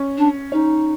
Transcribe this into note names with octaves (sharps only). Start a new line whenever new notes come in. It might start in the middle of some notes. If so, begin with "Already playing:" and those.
Already playing: C#4
D4
C#4 D#4